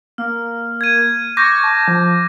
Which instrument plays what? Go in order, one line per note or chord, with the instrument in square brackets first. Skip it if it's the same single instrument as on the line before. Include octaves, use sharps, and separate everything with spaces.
[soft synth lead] A#3 [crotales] F6
[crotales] G#6 D#7
[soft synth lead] C#6 [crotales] D6 G6 A#6
[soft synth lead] A5
F3